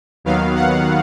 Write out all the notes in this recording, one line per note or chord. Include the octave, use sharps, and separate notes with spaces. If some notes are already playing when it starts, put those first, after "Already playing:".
D#2 D#3 F#3 B3 F5
F#5